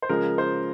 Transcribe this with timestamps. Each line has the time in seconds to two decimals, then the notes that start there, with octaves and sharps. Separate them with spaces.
0.02 C5
0.09 C#3 F3 G#3 A#4
0.38 C5